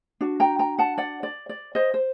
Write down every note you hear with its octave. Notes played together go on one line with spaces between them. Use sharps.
D4 F#4
G5 A#5
G5 A#5
F#5 A5
D5 F#5
D5
D5
C5 D#5
C5